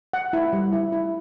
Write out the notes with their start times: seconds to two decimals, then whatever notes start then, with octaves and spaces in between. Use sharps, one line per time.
0.13 F#5
0.33 E4
0.53 G3
0.73 E4
0.92 E4